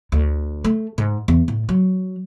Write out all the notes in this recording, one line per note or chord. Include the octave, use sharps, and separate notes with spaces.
D2
A3
G#2
E2
A2
F#3